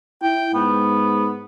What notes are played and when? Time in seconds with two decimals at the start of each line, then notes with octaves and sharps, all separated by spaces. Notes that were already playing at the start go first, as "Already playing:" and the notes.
0.22 E4 G5
0.54 G#2 B3